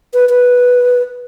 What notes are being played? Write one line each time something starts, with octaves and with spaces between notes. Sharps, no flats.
B4
B4